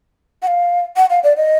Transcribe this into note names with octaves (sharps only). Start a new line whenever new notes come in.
F#5
F5
F#5
F5
D5
D#5